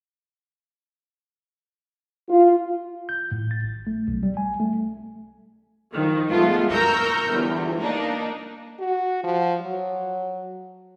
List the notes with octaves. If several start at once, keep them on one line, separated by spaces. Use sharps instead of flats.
F4
G6
A2
A6
G#1
A3
B1
G3
G#5
A3
D#3 F3
F3 G#3 A3 B3 F4
A#4 A#5 C#6 E6 F6 G6
G1 E2 E3
A#3 D4 D#4
F#4
F3
F#3